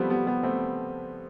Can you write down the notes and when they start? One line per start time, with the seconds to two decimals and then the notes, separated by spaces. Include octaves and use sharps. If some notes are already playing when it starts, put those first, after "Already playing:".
Already playing: F3 G3 A3 B3 C4
0.10 G3 B3
0.26 G3 B3
0.43 A3 C4